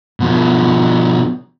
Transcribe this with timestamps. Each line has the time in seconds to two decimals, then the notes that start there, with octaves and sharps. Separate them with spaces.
0.20 B2 F3